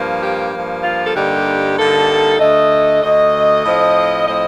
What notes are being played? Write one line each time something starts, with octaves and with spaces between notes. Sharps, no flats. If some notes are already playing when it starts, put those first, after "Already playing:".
Already playing: G2 F3 A#3
G4
G2 F3 A#3
F4
A4
G2 D3 G3 A#3 D#4 G4
G2 D3 G3 A#3 D#4 A4
D2 D3 A3 D#5
D2 D3 A3 D#5
A2 F3 C4
A2 F3 C4 D#5